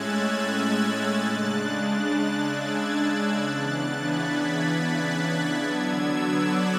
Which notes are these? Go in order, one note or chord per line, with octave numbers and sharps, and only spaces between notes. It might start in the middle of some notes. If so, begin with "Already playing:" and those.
Already playing: A2 G#3 C#4 E6 F#6 G#6 A6
F#6 A6
C#3 G#3 D4
F#6 A6
E6 G#6
E6 G#6
C#3 E3 B3 D4 F#6 A6
G#6 B6
F#6 A6
D3 F#3 B3 D4 E6 G#6
D6 F#6